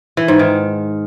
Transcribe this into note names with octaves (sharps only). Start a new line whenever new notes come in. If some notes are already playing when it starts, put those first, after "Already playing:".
E3
G#2
D#3